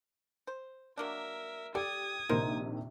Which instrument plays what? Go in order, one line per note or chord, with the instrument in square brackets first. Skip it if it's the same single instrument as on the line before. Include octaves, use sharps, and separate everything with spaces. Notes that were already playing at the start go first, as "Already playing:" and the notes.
[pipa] C5
[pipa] F#3 A#3 D4 [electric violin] A#4 E5
[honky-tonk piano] G4 [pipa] A4 D5 [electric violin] D#6 G#6
[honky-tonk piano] A#1 C3 D#3 [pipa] D#4 A#4 C5